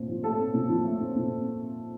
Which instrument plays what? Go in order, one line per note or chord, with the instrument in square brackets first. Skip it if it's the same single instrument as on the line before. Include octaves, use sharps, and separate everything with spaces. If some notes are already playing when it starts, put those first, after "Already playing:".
Already playing: [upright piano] A#2 A3 C4
F3
A3 A4
C4
A#2
F3
A3
C4
A#2